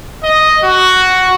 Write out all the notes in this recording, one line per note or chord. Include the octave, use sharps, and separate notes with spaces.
D#5
F#4